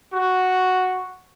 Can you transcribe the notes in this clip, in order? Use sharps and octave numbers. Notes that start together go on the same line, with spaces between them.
F#4